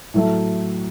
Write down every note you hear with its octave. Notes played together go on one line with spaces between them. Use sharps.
A2 F#3 A3